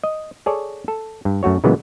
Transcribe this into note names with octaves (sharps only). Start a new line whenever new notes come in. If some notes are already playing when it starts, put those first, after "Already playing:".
D#5
G#4 A4 C#5 D5
A4
G2
F#2 A3 F#4 C#5
A#2 C#3 E3 F#3 G#3 B3